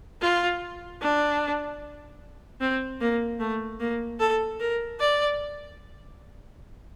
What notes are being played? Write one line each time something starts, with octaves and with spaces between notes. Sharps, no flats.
F4
D4
C4
A#3
A3
A#3
A4
A#4
D5